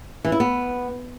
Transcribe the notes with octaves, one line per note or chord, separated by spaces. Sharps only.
E3
E4
B3